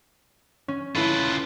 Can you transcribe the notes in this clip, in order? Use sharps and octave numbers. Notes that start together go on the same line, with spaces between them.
C#4
A3 E4 F4 B4